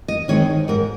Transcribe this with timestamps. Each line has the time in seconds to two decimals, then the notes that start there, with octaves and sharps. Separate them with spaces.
0.08 D#5
0.28 D#3 G#3 C4 D#4 C#5
0.68 G#2 A#4